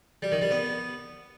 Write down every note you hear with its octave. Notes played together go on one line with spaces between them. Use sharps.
G3
D#3
G3
B3